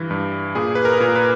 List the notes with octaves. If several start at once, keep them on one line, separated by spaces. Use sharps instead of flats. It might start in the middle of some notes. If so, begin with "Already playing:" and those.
Already playing: G2 E3
G2
A#2 G#4
B4
A#4
A#2
B4